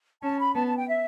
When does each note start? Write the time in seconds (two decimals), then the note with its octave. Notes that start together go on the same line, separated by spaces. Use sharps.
0.23 C#4 A5
0.40 B5
0.55 B3 A5
0.67 A5
0.77 G5
0.88 E5